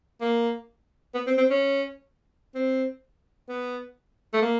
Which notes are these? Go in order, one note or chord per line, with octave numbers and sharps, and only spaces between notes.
A#3
B3
C4
C4
C#4
C4
B3
A3
A#3